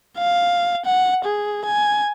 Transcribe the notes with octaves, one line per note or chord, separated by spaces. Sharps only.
F5
F#5
G#4
G#5